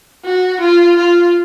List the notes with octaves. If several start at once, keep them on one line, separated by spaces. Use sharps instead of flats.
F#4
F4
F4